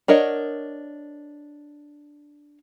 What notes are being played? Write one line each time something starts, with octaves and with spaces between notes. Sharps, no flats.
D4 A#4 C#5 D#5 F#5